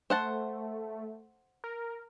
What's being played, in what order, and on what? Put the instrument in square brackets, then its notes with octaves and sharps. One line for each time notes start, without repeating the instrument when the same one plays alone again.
[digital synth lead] A3 [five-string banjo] C5 F#5 A5
[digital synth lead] A#4